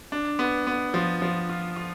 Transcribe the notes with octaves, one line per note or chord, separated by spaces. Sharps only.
D4
B3
B3
F3
F3
F4
F4